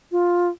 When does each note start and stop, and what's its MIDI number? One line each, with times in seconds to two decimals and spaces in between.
0.12 0.49 65